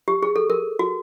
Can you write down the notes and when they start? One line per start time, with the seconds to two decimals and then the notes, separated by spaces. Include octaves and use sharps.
0.08 G4
0.23 G#4
0.36 A4
0.50 A#4
0.79 F#4